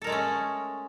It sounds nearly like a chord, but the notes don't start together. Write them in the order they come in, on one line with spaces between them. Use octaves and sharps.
A4 A#4 G#3 A3 C#4